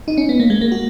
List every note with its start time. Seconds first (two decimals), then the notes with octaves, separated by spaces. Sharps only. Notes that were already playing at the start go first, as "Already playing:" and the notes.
0.08 D#4
0.18 C#4
0.29 B3
0.40 A#3
0.50 G#3
0.61 A#3
0.72 F#4